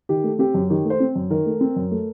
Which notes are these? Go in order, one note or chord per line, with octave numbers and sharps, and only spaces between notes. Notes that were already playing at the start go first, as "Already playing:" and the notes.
D#3 G4
A3
C4 G4
F#2
D#3 G4
A3
C5
C4
F#2
D#3 A#4
A3
C4
F#2
A3